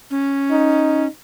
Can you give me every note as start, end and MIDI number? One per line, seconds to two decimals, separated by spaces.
0.11 1.07 61
0.51 1.07 63